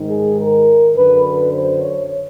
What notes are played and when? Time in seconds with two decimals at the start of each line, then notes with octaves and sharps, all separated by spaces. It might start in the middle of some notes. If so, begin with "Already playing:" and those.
Already playing: G#2 D#3
0.10 G#4
0.39 A#4
0.95 F#2 D3 B4
1.25 B4
1.53 C5
1.81 C#5